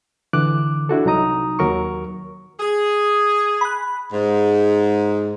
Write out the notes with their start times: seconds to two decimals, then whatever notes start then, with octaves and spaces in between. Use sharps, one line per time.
0.33 D3 E3 D6 F#6
0.89 D4 E4 F#4 A4
1.05 C2 F#3 D#4 A#5 D#6
1.59 D#2 F#3 A#4 C#6
2.60 G#4
3.61 B5 F#6
4.12 G#2